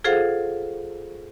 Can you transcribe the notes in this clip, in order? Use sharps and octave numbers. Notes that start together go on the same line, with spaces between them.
F4 G#4 A4 C5 F5 F#5